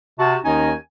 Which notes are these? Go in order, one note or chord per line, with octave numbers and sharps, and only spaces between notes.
C3 F#4 A5
D#2 D#3 C#4 D#4 D#5 G#5